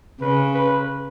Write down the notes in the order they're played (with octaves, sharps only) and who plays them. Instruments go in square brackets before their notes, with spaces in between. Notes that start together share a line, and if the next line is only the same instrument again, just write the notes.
[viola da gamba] C#3 [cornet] B4
[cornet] B4